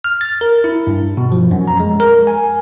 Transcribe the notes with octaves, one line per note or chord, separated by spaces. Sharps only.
F6
A6
A#4
E4
G2
B2
F3
F#2
A#5
G#3
A#4
G#5